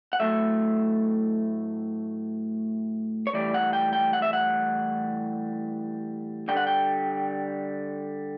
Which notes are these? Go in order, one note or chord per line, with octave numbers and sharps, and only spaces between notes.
F#5
A2 F#3 A3 E5
C#5
A2 E3 G3 D5
F#5
G5
G5
F#5
E5
F#5
D3 G3 G5
F#5
G5